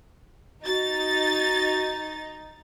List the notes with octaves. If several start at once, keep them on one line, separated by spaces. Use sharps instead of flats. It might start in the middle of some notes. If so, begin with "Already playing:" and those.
D#4 F#4 A6